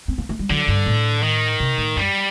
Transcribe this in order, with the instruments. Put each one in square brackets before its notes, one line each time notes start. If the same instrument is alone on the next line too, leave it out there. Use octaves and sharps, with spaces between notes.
[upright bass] C4
A#3
A3
G3
[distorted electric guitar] D3 [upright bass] F#3
[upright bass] G2
A2
[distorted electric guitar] D#3
[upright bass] C3
A2
[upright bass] F#2 [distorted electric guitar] G3